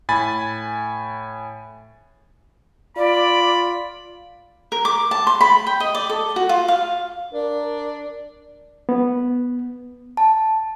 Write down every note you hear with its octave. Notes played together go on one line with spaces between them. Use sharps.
A2 G#5 B5 A6
F4 D5 B5
A#4
D6
A5
C6
B5
G5
D#5
D5
A4
F#4
F4
F5
D4 A#4
B3
A5